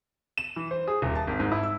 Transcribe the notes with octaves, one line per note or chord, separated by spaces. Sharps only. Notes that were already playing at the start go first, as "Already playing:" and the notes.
E7
E3
C5
G#4
D#1
A5
G#1
G#2
E4
E6